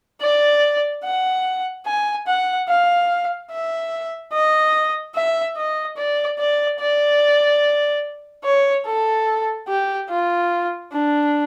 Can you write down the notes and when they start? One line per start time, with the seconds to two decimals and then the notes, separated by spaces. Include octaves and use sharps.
0.21 D5
1.04 F#5
1.86 G#5
2.27 F#5
2.69 F5
3.51 E5
4.33 D#5
5.15 E5
5.57 D#5
5.97 D5
6.39 D5
6.80 D5
8.44 C#5
8.86 A4
9.68 G4
10.09 F4
10.92 D4